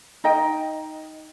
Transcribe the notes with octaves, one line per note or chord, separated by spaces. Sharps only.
D#4 D#5 G5